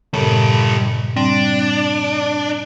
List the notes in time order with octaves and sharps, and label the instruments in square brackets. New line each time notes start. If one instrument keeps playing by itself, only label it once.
[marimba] G2 A#2 C#3 [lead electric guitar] G3 A4
[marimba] G3 C4 [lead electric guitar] D4